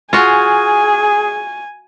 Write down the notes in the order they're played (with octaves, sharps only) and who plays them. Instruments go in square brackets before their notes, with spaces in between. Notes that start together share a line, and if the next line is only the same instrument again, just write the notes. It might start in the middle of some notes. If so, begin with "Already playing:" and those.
[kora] F4 F#4 [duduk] G#4 [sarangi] G#5